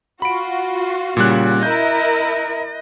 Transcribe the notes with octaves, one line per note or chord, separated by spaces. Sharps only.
F4 F#4 B5 D7
A#2 C#3 G3 F#6
E4 A#4 D#5 G6